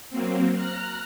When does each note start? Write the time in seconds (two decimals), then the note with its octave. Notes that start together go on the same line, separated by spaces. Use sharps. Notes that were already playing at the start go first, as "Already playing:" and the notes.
0.10 F#3 A#3 C4
0.54 A#5 F6 F#6